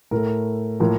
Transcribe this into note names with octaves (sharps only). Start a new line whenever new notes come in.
A2 A3 A#4
A2 F3 A#3 A#4